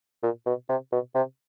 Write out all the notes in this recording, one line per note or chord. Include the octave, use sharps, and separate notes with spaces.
A#2
B2
C3
B2
C3